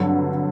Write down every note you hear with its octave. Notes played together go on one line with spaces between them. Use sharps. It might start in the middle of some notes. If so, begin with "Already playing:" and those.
Already playing: G2 D3 F#3